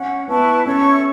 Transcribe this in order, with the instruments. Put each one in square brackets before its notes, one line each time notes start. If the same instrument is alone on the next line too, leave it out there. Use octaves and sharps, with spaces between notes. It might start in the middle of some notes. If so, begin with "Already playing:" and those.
Already playing: [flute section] C#4 F#5
[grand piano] B3 [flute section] E4 B4 A5 C#6
[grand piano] C#4 [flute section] A4 C#5 E5 C#6